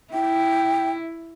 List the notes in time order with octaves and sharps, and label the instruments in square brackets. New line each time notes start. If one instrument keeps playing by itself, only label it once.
[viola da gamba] E4 [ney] G5